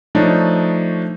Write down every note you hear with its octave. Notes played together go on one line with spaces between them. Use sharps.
F3 A3 D4 D#4 C#5